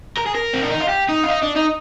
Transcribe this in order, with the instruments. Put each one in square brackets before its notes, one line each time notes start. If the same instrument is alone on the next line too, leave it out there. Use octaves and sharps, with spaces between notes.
[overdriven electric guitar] A#4
G#4
A#4
C4
D4
D#4
F4
G4
D#4
F4
D#4
D4
D#4